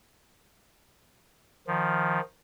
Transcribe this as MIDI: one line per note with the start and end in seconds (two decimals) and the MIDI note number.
1.67 2.20 51
1.67 2.20 53